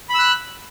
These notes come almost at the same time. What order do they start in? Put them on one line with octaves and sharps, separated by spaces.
B5 E6 F#6